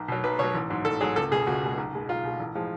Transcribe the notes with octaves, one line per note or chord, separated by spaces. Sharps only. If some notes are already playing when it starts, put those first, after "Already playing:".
Already playing: B1
B2 F#3
B1 B4
B2 F#3 C#5
A1
G#2 F#3
A1 A4
G#2 F#3 G#4
C#2 A4
B2 G#3 G#4
C#2 F#4
B2 G#3
B1
B2 G#3
B1 F4
B2 G#3
A1
A2 F3 G#3